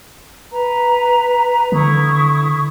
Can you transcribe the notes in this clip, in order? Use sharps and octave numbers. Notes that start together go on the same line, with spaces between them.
B4 A#5
D3 E4 C#6 D#6